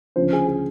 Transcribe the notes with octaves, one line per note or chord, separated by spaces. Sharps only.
D2 C#3 F3 C5
G#4
G#4